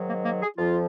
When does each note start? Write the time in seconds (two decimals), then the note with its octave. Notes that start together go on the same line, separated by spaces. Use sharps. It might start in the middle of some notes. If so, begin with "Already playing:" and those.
Already playing: G#2 D#3 F#3
0.09 A#3
0.25 A#3
0.42 G#4
0.58 F2 F3 F4